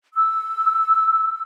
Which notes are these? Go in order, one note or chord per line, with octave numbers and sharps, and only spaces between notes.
E6